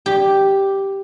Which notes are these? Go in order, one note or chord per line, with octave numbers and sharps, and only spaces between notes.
G4